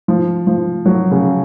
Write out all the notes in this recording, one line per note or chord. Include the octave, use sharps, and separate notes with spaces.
F3
F3
F#3
C#3